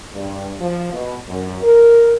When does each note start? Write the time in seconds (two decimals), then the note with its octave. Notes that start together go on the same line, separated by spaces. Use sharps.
0.13 G2
0.60 F3
0.93 B2
1.28 F#2
1.62 A#4